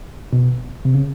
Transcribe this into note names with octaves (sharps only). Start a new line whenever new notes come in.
B2
C3
C#3